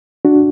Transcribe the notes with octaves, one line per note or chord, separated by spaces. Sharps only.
D4 F#4